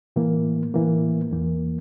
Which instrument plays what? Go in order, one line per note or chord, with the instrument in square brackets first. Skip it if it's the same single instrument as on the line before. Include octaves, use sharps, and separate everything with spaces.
[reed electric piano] A2 E3 A#3
A2 E3 A#3
E2 E3 A#3